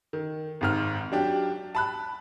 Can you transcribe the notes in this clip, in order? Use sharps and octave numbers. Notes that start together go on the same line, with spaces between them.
D#3
G#1 G#2 F6
F#3 D4 G4
A5 B5 F#6